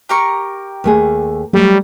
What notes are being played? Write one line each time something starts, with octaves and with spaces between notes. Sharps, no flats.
G4 A#4 C#6
D#2 A3 G#4
F#3 G3 A3